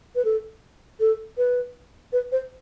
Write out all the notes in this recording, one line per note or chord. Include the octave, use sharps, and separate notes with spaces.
B4
A4
A4
B4
B4
C5